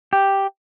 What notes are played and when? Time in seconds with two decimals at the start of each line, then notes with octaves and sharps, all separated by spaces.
0.13 G4